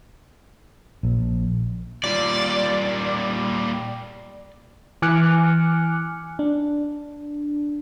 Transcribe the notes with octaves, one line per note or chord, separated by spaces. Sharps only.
A#1
A#2 G3 D5
E3 G#5 D6 F6 F#6 C#7
D4